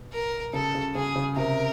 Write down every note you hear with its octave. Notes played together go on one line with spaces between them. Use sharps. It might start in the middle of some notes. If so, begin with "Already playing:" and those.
Already playing: B2
A#4
C#3 A4
C#3
C#3 G#4
C#3
C3 A#4